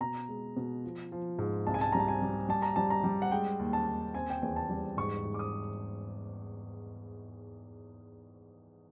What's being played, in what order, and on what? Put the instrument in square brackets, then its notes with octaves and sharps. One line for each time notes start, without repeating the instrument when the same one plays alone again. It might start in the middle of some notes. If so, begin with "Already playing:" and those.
[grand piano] B2 A#5
G#3
B2
F3
F3
G#2
C2 A5
G#5
A5
G3 A#5
A5
G#5
G3
G3 A5
A#5
G3 A5
A#5
G3
F#5
G#3 G5
D#2
A5
D#2
C4 G#5
G5
E2 G#5
A5
G3
G#2 C#6
G#2
D6
D#6